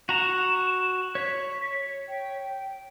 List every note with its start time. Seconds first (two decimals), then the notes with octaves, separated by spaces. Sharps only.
0.09 F#4 A#5 E7
1.15 C#5 B6
2.08 G5